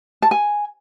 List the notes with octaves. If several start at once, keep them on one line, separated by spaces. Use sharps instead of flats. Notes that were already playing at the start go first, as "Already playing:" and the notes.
A5
G#5